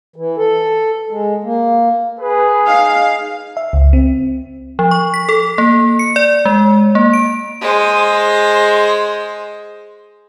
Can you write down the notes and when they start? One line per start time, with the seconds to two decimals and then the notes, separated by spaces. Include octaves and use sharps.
0.16 E3
0.37 A4
1.11 G#3
1.44 A#3
2.19 G#4 B4
2.67 D#4 F5
3.57 E5
3.73 C#2
3.93 C4
4.79 F3
4.91 C#6
5.14 B6
5.29 A4
5.58 A#3
5.99 C#7
6.16 D5
6.45 G#3
6.95 A#3
7.13 D7
7.61 G#3 C5